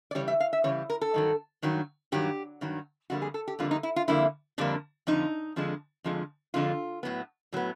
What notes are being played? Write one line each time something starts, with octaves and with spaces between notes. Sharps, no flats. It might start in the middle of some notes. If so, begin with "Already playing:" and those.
D5
C#3 E3 G3 C#5
E5
F5
E5
C#3 E3 G3 C#5
A#4
A4
G2 D#3 F#3
G2 D#3 F#3
G2 D#3 F#3 G4
G2 D#3 F#3
F2 D3 G3 A#3 F#4
G#4
A4
G4
F2 D3 G3 A#3 F4
D#4
E4
F4
F2 D3 G3 A#3 E4
F2 D3 G3 A#3 D4
F2 D3 F3 D#4
F2 D3 F3 G#3
F2 D3 F3 G#3
F2 D3 F3 G#3 F4
A2 F#3 B3
A2 F#3 B3